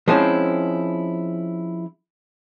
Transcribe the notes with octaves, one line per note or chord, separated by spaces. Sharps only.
F3 G#3 C4 C#4 E4